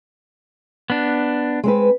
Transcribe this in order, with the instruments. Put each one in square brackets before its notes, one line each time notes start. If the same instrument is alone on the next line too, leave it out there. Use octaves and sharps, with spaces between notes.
[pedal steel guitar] B3 D4
[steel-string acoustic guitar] G#3 C4 B4